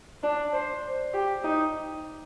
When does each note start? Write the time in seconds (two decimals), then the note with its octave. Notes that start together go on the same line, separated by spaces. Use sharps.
0.23 D4
0.53 C5
1.13 G4
1.44 D#4